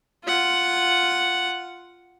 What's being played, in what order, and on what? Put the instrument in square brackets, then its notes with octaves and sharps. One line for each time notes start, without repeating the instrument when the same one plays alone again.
[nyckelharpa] F4 F#5